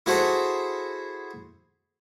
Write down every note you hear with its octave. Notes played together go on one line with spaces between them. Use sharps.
E4 F#4 G#4 A4 C5 E5